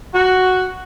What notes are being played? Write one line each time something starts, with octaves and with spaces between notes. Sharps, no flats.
F#4